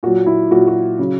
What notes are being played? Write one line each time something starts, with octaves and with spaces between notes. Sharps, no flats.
A#2 F#3 F#4
E4
A#2 F#3 F#4
F#4
C#3 F#3